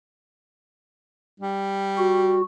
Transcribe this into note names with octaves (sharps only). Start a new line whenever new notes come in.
G3
F#4